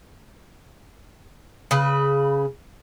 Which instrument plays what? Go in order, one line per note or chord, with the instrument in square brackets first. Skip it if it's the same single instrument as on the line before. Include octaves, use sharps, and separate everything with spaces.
[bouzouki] C#3 B4